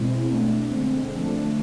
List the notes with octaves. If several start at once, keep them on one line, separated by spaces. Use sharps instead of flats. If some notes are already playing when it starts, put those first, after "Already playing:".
Already playing: B2 G#3 C4 E4
A3 D4
B2
D3 G#3 C4
D3 F3 A3 D4